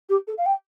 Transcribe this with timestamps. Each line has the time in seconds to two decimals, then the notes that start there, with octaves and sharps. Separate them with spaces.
0.09 G4
0.27 A4
0.37 F5
0.46 G5